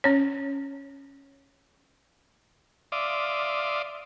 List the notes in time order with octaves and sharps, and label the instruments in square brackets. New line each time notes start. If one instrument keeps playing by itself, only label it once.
[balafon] C#4 C#5
[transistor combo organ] D5 E5 F5 C6 D6 D#6